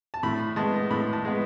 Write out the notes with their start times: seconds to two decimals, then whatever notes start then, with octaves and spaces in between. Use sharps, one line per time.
0.14 A5
0.23 A2 B5
0.56 G#3 B3 A5
0.90 A2 B5
1.13 A5
1.25 G#3 B3